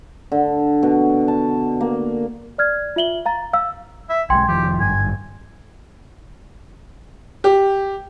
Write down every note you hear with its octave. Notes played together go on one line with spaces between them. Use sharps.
D3
B2
A5
A#3
D5 F6 G#6
F4 E5 F#7 G7
F5 A#5 A6
F5 E6
E5
B1 F3 G#3 G5 G#5 C6
F1 D#3 F3 G4
G#1 G2 G#5
G4